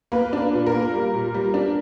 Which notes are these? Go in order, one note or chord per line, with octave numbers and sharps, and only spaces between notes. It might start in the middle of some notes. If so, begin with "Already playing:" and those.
A#3 B4
D4
B4
A#2
A#4
A#3
G3
A#2
G3
D4